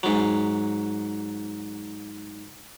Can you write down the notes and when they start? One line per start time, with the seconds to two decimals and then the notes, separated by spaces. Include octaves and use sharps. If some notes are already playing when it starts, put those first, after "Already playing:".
0.03 G#2 F#3